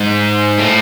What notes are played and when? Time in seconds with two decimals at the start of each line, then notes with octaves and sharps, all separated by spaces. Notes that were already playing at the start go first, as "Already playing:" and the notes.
Already playing: G#2
0.58 A2